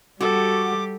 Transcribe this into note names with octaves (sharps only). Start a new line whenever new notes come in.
G3 F#4 G4 A4 D6